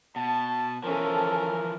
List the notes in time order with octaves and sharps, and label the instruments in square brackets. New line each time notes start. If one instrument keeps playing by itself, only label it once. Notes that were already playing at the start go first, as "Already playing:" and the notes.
[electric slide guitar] B2 [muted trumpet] A5
[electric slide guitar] E3 F3 [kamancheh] C#4 A4 [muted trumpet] A#4